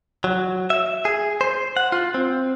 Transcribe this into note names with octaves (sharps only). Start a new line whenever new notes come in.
F#3
E5
G#4
C5
F#5
F4
C4